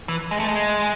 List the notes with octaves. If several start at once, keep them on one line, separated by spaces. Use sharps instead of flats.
E3
G#3
A3
G#3